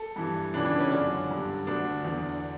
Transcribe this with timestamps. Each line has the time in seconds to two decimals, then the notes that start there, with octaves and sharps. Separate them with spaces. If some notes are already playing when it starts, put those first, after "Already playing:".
Already playing: A4
0.16 G2 E3
0.54 C#2 C#3 E3 D4
0.65 D4
0.79 C#4
0.91 F#2 D3 D4
1.29 G2 D3
1.67 D2 D3 D4
2.04 E2 D3